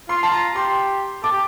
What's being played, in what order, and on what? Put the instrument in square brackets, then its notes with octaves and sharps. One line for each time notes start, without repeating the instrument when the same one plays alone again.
[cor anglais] F4 [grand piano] C6
[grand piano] A5
[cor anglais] F4 [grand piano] A#5
[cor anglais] G4 [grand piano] C6
[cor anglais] A4 [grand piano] D6
[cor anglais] G4